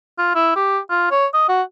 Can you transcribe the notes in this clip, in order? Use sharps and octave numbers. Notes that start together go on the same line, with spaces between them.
F4
E4
G4
F4
C#5
D#5
F#4